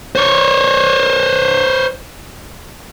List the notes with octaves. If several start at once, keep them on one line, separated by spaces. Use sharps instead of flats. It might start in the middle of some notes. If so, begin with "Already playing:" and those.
C5 C#5